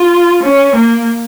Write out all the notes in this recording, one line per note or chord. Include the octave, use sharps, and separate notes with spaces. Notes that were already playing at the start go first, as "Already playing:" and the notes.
Already playing: F4
C#4
A#3